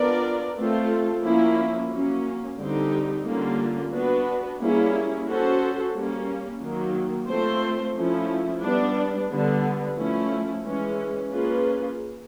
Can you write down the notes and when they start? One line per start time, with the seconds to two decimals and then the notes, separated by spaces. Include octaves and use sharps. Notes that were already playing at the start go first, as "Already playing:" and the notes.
Already playing: B3 D4 F4 A#4 D5
0.57 A3 C4 F4 A4
1.24 F3 A#3 C#4 E4
1.91 F#3 A#3 C#4
2.58 D3 G3 C4 D#4 G4
3.26 D3 G3 A#3 C#4 F4
3.93 B3 D4 F#4 B4
4.60 G3 A#3 C#4 E4 G#4
5.27 C#4 F#4 A4 C5
5.94 G3 A#3 C#4
6.61 D#3 F#3 A#3
7.29 A3 C4 F4 A4 C5
7.96 F3 A3 C#4 E4
8.63 G3 B3 D4
9.30 D3 G3 B3
9.97 F3 A3 C#4 E4
10.64 E3 G#3 C#4
11.31 A#3 C#4 F4 G#4 B4